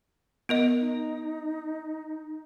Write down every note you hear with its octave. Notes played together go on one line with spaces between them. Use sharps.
B3 A#4 D#5
D#4